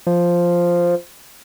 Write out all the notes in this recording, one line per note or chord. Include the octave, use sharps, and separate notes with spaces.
F3